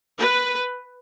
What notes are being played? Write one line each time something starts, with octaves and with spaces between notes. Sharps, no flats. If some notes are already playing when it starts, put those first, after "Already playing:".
B4